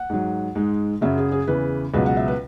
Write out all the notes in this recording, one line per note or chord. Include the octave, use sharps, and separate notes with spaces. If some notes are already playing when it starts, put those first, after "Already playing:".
Already playing: F#5
G#2 F#3
G#2 G#3
F#2 C#3 F#3 E5
G#4
G#4
E2 C#3 E3 B4
C#2 B2 F#3 B4
F#5
E5
B4